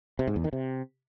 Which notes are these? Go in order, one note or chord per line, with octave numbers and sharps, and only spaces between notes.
C3
G#2
E2
D#3
C3